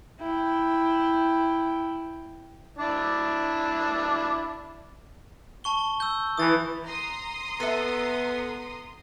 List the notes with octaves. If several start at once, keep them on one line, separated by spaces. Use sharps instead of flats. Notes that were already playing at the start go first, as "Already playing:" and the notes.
E4 G5
D4 E4 D5
A5 C#6 G7
E6 G6
E3 D#6 A6
A#5 C6 D#6
B3 A4 E5